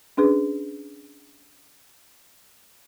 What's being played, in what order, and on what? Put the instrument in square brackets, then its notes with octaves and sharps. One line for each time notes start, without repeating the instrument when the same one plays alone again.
[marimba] C#4 D4 G#4 B4